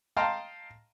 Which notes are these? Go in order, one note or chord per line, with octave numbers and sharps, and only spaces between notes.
D#5 F5 G5 A5 A#5 C6